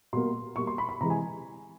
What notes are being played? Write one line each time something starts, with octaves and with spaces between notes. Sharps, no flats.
B2 G3 A#3 C6
B2 G3 A#3 C#6
C6
B5
B5
C3 E3 G#3 A#5
G#5